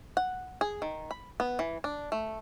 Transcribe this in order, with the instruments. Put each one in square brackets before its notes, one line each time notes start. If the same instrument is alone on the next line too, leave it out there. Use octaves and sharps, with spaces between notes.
[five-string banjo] F#5
G#4
D#3
B5
B3
E3
D4
A3